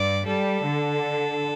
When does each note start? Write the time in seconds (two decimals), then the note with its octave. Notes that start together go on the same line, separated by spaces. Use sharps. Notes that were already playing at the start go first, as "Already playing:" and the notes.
Already playing: G2 D5
0.27 G3 A4
0.66 D3